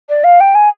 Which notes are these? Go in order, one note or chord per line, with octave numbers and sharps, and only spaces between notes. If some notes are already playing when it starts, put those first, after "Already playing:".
D5
F5
G5
G#5